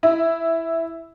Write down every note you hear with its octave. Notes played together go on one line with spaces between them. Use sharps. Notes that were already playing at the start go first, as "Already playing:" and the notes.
E4